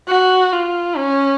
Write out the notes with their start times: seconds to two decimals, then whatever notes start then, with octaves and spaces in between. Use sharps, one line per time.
0.08 F#4
0.52 F4
0.97 C#4